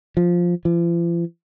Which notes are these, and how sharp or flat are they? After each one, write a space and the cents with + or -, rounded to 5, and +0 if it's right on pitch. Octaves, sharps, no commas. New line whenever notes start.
F3 +5
F3 -45